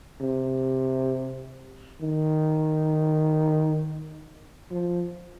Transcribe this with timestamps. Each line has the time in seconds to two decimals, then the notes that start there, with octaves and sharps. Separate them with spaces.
0.21 C3
2.01 D#3
4.71 F3